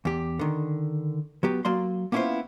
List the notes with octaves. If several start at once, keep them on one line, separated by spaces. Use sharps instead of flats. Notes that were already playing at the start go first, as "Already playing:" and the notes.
E2 G4
D3 D#3
F#3 B3 G4
F#3 A#3 D5 C6
A#3 B3 C#4 E4 F4 C5